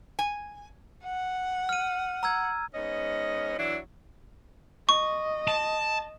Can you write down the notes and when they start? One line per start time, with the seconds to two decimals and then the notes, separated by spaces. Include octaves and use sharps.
0.19 G#5
1.05 F#5
1.69 F6 D#7
2.23 A#5 E6 G#6
2.75 G#2 B3 C#4 D#5
3.59 E3 F#3 D4 E4
4.89 D#5 C#6
5.48 A5